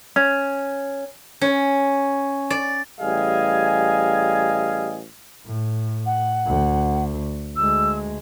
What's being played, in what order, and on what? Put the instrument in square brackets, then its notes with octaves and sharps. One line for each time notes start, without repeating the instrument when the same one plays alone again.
[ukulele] C#4
[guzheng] C#4
D5
[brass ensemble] A1 G3 G#4 D#5 F5 G#5
[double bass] A2
[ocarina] F#5
[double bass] D2
[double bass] D2 G#3 [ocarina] E6